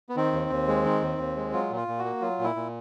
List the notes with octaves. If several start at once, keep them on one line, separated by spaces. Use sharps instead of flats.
B3
D#3 C4
D#2
D#2
G#3
D#3
D#2
D#2
G#3
F#3 F4
A#2
F4
A#2
F#4
A#3
F#3 F4
A#2
E4
A#2